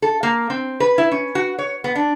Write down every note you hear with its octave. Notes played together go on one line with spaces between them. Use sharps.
A4
A#3
C4
B4
E4
C#4
F#4
C#5
B3
D4